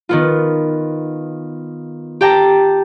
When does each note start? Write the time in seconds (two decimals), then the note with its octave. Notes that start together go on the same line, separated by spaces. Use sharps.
0.09 D#3 B3 F4
2.21 G4 G5 A5 A#5